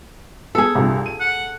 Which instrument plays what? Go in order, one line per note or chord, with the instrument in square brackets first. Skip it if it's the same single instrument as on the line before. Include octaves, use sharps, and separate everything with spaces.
[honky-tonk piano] B3 [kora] G#4 A4
[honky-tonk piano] C2 G2 A#2
D#7
[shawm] F#5